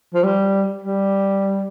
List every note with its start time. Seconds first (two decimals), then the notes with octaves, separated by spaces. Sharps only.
0.14 F3
0.24 G3
0.82 G3